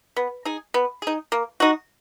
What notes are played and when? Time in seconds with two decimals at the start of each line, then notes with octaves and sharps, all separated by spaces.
0.16 B3
0.45 D#4 G#4
0.74 B3
1.02 D#4 G#4
1.32 A#3
1.60 D#4 F#4